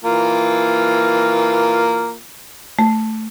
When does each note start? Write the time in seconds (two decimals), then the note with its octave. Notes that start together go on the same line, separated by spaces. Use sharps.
0.05 E3 A#3 F4
2.79 A3